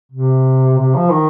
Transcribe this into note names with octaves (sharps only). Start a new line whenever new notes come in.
C3
C3
F3
D#3